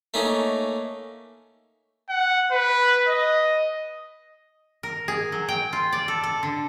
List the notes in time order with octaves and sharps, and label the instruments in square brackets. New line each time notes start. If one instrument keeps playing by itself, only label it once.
[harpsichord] A3 A#3 C#4 D#4
[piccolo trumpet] F#5
B4
D#5
[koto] A#4
G#4
F#3
G5
F4
D5
A4
A4
D3